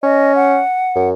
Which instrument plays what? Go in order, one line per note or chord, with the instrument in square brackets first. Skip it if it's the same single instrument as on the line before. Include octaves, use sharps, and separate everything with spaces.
[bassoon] C#4 [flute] D#5
[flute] F#5
[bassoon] F#2